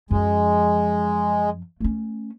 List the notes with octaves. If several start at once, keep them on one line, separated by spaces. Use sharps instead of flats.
F#2 F3 G#3
A3 C#4